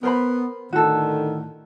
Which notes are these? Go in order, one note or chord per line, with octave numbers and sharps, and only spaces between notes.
B3 A#4 C5 B5
A2 D3 D#3 F#4 A4